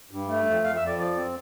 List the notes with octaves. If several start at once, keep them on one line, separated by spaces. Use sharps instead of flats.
G2
A3
F2
F2 F5
E5
F2
D5
F3 D5
C4